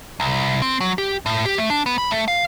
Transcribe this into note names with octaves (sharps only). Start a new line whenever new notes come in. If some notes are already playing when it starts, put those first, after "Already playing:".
C2
C4
F#3
G4
A2
G4
A3
D4
B3
B5
A3
F5